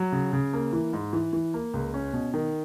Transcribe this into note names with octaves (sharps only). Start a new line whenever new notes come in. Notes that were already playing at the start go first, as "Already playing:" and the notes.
Already playing: F#3
C#3
C#3
A#3
E3
G#2
E3
E3
A#3
C#2
C#4
B2
D#3